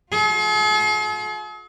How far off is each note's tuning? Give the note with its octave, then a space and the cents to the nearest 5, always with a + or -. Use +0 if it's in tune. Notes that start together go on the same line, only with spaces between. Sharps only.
F4 +45 G#4 +45